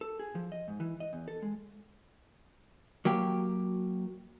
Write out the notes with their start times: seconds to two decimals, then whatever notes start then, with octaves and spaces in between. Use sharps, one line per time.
0.01 A4
0.19 G#4
0.35 F3
0.52 D#5
0.68 G#2
0.80 E3
1.00 D#5
1.13 E2
1.28 A4
1.42 G#3
3.05 F#3 A#3 G4